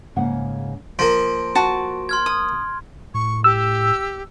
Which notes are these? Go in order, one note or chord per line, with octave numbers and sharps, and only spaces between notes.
G#2 C#3 A#3 F#5
F3 A#3 C6 D7
F#4 A5
C6 F6 G#6
D#6
A2 C#6
G4 E6